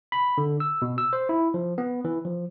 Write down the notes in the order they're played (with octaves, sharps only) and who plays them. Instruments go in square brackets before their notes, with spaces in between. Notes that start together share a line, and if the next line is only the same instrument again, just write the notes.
[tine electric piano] B5
D3
E6
B2
E6
C5
E4
F3
B3
E3
F3